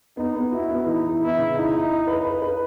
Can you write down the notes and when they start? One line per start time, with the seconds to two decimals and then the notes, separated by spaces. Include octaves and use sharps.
0.17 B3 D#4
0.35 B3
0.52 E4 F#4
0.69 B3
0.86 E3 D#4
1.04 E3
1.21 B3 E4
1.38 C#3
1.56 D#4 E4
1.73 E4
1.90 D#5
2.07 B4
2.25 B4
2.42 B4